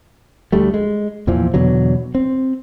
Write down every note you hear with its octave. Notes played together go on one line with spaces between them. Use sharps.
D2 G3 A3
G#3
E2 A#2 E3 F3
E2 B2 D3 F#3
C4